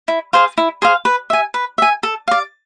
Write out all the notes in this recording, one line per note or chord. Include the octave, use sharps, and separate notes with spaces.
E4
G#4 C5 F5
E4
G#4 C5 F5
B4
E5 G#5
B4
E5 G#5
A4
D5 F5